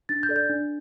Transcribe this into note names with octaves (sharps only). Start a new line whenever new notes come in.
D4 A6
G6
A4 D5
G6
D4